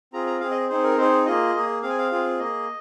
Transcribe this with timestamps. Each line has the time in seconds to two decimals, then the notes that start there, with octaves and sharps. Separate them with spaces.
0.13 C4 F4 G#4 A#5
0.27 A#5
0.40 C4 G#4 F5
0.51 D#5
0.69 C4 D#4 G#4 C5
0.83 A#4
0.97 C4 D#4 G#4 C5
1.26 A#3 F4 G#4 D#5
1.54 A#3 G#4
1.82 C4 G#4 F5
1.90 G#5
1.98 F5
2.11 C4 F4 G#4
2.39 A#3 G#4 D#5